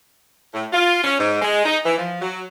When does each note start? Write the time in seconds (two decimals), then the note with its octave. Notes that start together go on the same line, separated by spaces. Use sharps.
0.53 A2
0.73 F4
1.04 C#4
1.19 G#2
1.41 G#3
1.65 D#4
1.85 E3
1.98 F3
2.22 F#3